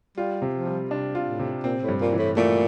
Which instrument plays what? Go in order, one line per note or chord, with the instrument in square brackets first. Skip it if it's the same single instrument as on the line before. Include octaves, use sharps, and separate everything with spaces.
[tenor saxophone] G3 [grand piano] F4
[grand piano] C3
[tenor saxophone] F3
[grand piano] G3
[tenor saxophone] C3 [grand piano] D4
[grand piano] F4
[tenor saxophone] A2
[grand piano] C3
[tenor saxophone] A#2 [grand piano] C4
[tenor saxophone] A2
[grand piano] G2
[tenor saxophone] A#2
[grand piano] E3
[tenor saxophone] A2
[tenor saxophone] A#2 [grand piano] A3